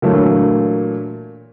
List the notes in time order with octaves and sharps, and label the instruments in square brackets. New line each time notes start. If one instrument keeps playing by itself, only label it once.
[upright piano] A#2 D3 E3 F#3 A3 A#3